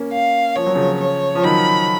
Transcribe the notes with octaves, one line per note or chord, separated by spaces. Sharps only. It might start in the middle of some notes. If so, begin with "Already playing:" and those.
Already playing: A#3 C#4
F5
F3 C#5
F#3
C#3 F3
C#5
F3
D#3 F#3 B5